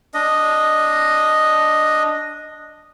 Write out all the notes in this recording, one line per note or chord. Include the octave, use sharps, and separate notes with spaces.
D4 D#5